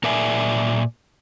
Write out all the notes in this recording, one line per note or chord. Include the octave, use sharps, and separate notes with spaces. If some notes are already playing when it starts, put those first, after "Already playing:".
A#2 A#4 D5 E5 G#5